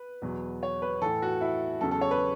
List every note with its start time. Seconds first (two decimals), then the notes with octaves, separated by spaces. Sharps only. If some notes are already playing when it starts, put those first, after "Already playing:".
Already playing: B4
0.22 E2 B2 F#3
0.63 C#5
0.82 B4
1.02 A2 E3 A4
1.22 F#4
1.41 E4
1.81 E2 C#3 F#3 A4
1.91 A4
2.01 C#5
2.11 B4